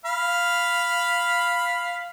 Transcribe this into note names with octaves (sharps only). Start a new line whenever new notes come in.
F5 B5